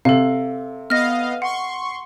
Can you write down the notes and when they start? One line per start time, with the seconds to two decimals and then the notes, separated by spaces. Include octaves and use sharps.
0.05 C3 A4 F5
0.90 B3 D#5 F5 F6 A#6
1.42 F#5 C6 C#6